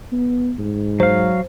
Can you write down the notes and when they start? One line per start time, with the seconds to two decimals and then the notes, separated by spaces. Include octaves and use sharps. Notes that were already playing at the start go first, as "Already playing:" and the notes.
0.12 B3
0.59 G#2
1.00 F#3 C5 F5